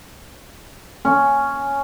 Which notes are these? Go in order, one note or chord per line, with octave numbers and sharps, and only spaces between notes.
C#4